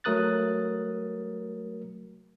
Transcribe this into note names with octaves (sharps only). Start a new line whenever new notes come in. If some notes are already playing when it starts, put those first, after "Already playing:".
F#3 A3 A#4 D#6 F#6 A6